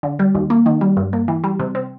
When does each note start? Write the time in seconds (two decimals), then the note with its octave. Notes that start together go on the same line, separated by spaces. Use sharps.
0.03 D3
0.19 G3
0.35 D#2
0.50 A#3
0.66 D#3
0.81 G3
0.97 G2
1.13 A#3
1.28 E3
1.44 G3
1.59 C3
1.75 C4